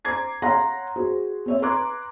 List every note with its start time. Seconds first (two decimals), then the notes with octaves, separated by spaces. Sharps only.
0.05 C5 A#5 D6 G#6 C7
0.42 C#5 F5 F#5 A#5 C6 A#6
0.96 F#4 G#4 C5
1.46 C4 C#5 E5
1.62 B4 A#5 C6 D6 F#6 G#6